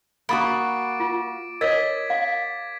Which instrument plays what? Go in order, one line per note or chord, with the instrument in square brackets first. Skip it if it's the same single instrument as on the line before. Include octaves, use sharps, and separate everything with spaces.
[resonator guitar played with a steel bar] A#3 F#4 [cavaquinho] B5 D#6 [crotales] D6 A6 D7
[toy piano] F4
[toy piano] A#4 C#5 [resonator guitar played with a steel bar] D#5 [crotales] G#6 A6 B6
[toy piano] F5